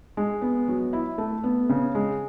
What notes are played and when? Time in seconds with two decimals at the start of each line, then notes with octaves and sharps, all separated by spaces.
0.17 G#3
0.42 B3
0.68 F#3
0.93 E4
1.18 A3
1.44 B3
1.69 C#3
1.95 G#3